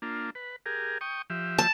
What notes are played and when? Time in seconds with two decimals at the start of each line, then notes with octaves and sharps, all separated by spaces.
0.02 A#3 D4 F4
0.35 B4
0.66 G4 G#4 A#4
1.01 G5 C#6 D#6
1.30 F3 G4 E5
1.58 A5